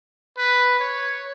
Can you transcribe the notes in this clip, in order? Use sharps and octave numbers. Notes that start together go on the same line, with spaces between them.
B4
C#5